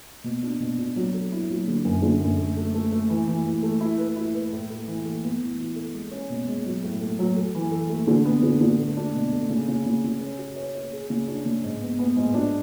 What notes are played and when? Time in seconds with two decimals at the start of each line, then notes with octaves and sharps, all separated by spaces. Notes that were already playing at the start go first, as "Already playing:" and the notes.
0.24 B2
0.43 D4
0.60 B2
0.78 D4
0.96 F#3
1.14 A4
1.32 E4
1.50 F#3
1.68 D3
1.85 F#2
2.02 D3
2.20 F#2
2.38 A3
2.57 A3
2.74 A3
2.92 A3
3.09 E3
3.27 E3
3.45 E3
3.63 A3
3.80 E4
3.98 B4
4.16 E4
4.35 B4
4.52 A2
4.70 A3
4.88 E3
5.05 A3
5.24 B3
5.41 E3
5.59 E4
5.76 A4
5.94 G#3
6.11 C#4
6.30 B2
6.47 G#3
6.65 F#3
6.83 A2
7.01 A3
7.19 F#3
7.36 A4
7.55 E3
7.71 A4
7.90 A3
8.07 D3
8.25 B3
8.43 D3
8.61 D3
8.79 A3
8.97 D4
9.14 B2
9.32 A3
9.49 C#3
9.68 C#3
9.86 C#3
10.04 C#3
10.21 C#4
10.39 F#4
10.56 C#5
10.75 C#5
10.93 G#4
11.10 C#3
11.28 D4
11.46 C#3
11.64 G#2
11.81 B3
11.99 B3
12.16 G#2
12.34 D4